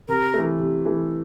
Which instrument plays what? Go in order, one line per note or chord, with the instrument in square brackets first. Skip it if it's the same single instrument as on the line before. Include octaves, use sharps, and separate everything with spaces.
[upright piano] C3 [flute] A#4
[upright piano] E3 A3
C3
E3 A3